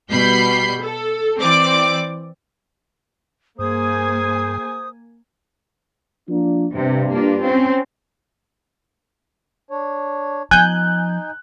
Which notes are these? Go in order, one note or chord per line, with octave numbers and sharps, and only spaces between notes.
B2 G3 B5 G6 C7
A4
E3 C4 D5 D6
G2 A#3 G#4 C5 G#5 D#6
F3 A#3 D4
G2 C3
A#3 D4 F4
C4 C#4
D4 C#5
F3 B3 D#4 G#5 F#6 G6